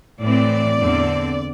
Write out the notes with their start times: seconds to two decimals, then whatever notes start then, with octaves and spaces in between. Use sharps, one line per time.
0.21 A2 E3 C4 D5
0.78 E2 D3 C4